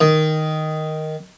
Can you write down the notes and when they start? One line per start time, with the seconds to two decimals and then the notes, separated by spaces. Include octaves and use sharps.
0.01 D#3